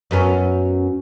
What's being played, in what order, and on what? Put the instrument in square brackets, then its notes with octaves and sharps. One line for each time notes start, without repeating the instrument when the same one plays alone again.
[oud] F#2 B3 C#4